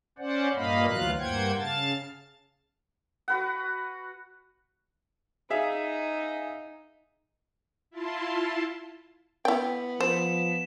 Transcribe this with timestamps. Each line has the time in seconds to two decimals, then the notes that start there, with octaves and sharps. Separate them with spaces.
0.18 C#4 C5 D5 F#5
0.56 G2 A#2 A#3 D#5 F5 B5
0.86 D2 E3 F#3 F4 F5 F#6
1.19 G2 A#3 C5 F#5 G5 G#6
1.59 C#3 F5 A5 A6
3.28 F#4 B4 F#5
5.50 D#4 G#4 E5 F5
7.91 E4 F4 A5 C6
9.45 B3 E4 G5
10.01 F3 C5 E7